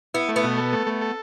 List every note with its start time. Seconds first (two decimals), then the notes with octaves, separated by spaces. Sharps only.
0.14 B3 E4
0.29 A3
0.36 B3
0.44 B2
0.58 A4
0.73 A3
0.87 A3
1.02 A4